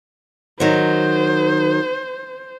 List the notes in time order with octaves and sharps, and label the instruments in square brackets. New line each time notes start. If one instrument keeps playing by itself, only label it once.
[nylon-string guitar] D#3 F#3 [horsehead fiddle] C5